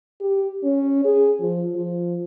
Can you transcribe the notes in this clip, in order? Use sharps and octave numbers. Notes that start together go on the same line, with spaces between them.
G4
C#4
G#4
F3
F3